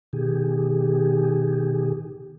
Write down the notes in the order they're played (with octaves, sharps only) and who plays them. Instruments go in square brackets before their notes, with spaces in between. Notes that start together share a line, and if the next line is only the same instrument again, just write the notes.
[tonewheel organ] B2 D#3 G4 G#4